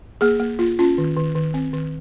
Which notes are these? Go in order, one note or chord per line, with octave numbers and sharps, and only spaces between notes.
A#3 G#4
A#3
A#3 F4
C#4 F4
D#3
D#3
D#3
C4
D#3